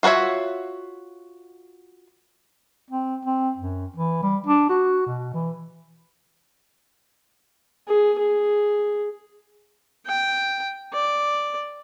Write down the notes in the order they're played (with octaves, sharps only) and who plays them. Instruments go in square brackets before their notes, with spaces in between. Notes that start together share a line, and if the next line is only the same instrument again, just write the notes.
[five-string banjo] F4 F#4 A#4 C#5 E5
[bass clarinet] C4
C4
F#2
E3
G3
D4
F#4
B2
E3
[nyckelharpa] G#4
G#4
G5
D5